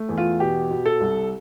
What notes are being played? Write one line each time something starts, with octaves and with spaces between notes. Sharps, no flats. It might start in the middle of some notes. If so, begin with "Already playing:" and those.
Already playing: A3
E2
F4
B2 G4
B2
A4
C2